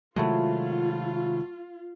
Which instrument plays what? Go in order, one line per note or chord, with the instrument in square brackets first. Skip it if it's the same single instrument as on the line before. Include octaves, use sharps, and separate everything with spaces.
[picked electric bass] C3 D#3 G#3 [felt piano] F#3 A3 E4 [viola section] F4